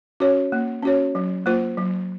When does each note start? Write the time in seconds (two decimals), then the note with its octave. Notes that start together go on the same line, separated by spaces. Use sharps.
0.20 C#4 F#4 C#5
0.52 A#3
0.83 C#4 F#4 C#5
1.15 F#3
1.46 A#3 F4 C5
1.77 F#3